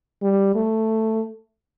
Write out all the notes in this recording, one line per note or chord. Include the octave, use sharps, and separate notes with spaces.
G3
A3